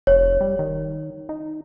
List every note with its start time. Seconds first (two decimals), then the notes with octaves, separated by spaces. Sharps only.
0.07 F1 C#5
0.41 G3
0.59 D#3
1.29 D#4